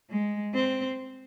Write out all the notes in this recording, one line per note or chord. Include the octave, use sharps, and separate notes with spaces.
G#3
C4